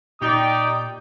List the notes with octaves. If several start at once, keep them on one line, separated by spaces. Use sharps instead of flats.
A#2 D#4 G4 D5 G5 D#6